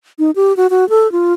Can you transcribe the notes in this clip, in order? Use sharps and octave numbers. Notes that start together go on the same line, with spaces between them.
D#4
G4
F#4
F#4
A4
F4